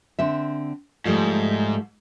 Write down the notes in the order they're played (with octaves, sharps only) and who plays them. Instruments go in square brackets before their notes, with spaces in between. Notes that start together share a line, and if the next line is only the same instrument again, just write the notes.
[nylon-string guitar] D3 C4 E5
[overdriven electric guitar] G#2 [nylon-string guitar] F3 G3 A3